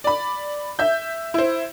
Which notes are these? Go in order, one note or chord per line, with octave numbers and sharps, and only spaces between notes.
D5 B5
E5 G6
E4 C5